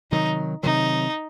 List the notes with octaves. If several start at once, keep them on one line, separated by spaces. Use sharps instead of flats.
C3 D#3 F#3 D#4
C3 D#3 F#3 D#4